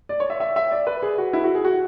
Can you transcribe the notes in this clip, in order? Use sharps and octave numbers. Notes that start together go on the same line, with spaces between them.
D5
C#5
E5
E5
E5
D5
B4
G#4
F#4
E4
F#4
G#4
F#4